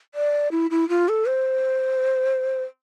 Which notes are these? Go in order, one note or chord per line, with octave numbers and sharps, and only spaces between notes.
D5
E4
E4
F4
A4
C5